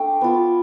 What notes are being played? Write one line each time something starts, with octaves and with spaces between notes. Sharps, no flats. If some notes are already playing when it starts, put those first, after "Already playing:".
Already playing: A3 D4 G5
B3 F4